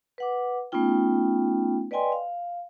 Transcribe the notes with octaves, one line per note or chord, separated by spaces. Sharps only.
B4 F#5 D6
A3 B3 C#4 D#4 F4 G5
B4 D5 D#5 G5 G#5 C6
F5